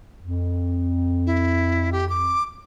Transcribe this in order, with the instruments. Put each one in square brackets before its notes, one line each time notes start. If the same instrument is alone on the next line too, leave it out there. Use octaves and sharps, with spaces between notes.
[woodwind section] F2
[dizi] E4
G4
D6